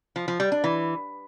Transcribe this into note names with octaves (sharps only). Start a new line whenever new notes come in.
F3
F3
G3
D4
E3